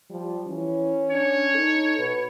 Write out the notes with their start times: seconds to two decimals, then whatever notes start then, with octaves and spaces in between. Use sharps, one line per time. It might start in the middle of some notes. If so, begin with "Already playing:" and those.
0.11 F3 G3
0.47 E3 C#4
1.11 D4 C#5
1.54 D#4 A4
1.98 B2 B4